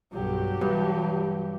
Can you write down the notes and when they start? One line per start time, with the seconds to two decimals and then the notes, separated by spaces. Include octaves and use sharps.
0.12 B1 G2 F#3 G4
0.61 G2 E3